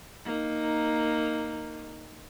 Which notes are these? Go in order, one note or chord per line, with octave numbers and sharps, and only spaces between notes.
A#3 D#4